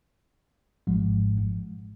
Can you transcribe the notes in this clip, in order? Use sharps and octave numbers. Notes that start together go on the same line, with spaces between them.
G#1 G#2 F3 G#3